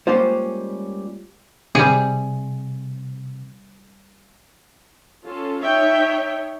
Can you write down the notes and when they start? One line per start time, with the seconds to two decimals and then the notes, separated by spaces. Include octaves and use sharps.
0.07 G3 G#3 A#3 C#4 F4 C5
1.75 C3 G3 G#4
5.24 C#4 F4 A4
5.62 D#4 C#5 E5 G5